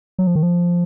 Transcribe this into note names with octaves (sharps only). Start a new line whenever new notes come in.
F#3
F3
D#3
F3